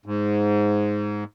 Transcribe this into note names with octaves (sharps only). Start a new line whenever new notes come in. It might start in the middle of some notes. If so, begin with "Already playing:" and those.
G#2